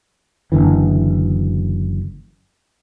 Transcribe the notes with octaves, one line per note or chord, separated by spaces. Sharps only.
F#1 B1 D3 E3